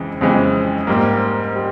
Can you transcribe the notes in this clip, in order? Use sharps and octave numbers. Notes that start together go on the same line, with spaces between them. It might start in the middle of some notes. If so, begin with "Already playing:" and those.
Already playing: F2 C#3 E3 G#3
F2 C#3 E3 G#3 C4
G#2 G3 A#3
G3